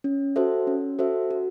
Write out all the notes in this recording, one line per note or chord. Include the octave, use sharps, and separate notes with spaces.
C#4
F#4 A4 C5 E5
C#4
F#4 A4 C5 E5
F#4